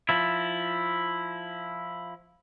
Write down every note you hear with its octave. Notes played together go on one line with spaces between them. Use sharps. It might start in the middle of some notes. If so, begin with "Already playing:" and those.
F3 E4